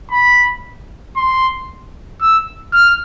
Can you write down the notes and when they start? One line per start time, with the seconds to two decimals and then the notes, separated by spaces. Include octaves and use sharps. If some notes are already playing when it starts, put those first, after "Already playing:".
0.11 B5
1.16 C6
2.21 E6
2.73 F6